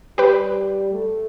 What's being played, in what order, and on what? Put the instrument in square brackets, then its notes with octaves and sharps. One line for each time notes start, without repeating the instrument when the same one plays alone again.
[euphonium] G3 [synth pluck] G4 B4
[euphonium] A3